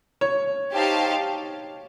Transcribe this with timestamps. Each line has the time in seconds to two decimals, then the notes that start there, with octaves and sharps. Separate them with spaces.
0.21 C#5
0.73 D#4 G4 C5 F5 A5